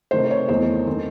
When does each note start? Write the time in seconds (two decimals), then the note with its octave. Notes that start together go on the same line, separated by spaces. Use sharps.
0.11 C3 D#3 A3 C5
0.31 C#5
0.49 E2 D#3 A3 D#4 C5
0.87 D#3 A3 C4